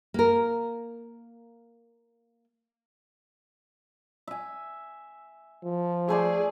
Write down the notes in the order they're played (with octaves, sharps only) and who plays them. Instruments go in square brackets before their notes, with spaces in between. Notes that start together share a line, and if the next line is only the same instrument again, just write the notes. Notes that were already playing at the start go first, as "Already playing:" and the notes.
[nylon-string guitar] A#3 A#4
[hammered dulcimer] E5 G#5
[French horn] F3
[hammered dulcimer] A3 C5 D5 [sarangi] G#4